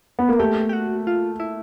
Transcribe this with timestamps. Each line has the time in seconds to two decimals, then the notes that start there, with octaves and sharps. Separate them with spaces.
0.19 B3
0.29 A#3
0.39 A3 G4
0.69 G4
0.73 F#4
1.07 F4
1.40 E4